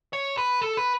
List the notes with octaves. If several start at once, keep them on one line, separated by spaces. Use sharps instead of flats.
C#5
B4
A4
B4